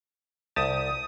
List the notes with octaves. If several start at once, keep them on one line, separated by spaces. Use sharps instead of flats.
C2 G4 A5 D#6